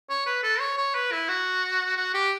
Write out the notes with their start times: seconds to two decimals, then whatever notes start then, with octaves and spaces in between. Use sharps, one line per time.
0.10 C#5
0.27 B4
0.43 A4
0.60 C#5
0.78 C#5
0.95 B4
1.12 E4
1.28 F#4
1.97 F#4
2.14 G4